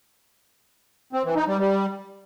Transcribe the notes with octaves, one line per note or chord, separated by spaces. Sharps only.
C4
E3
D#4
G3
G3